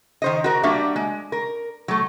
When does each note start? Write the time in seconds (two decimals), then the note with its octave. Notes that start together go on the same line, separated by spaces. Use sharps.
0.22 D#3 C5 D#5
0.44 F#4 A#4
0.63 G3 A#3 D4 F#4 G4 E5
0.96 G#3
1.32 A#4
1.88 F#3 A3